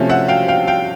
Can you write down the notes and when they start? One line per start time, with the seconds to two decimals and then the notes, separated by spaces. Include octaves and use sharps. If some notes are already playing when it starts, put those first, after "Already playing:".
Already playing: C3 F3 A3 C#4
0.09 E5 F#5
0.28 F5 G5
0.48 F5 G5
0.67 F5 G5